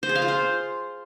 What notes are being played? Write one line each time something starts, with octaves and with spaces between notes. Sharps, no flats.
C5
G#4
F5
F4
C5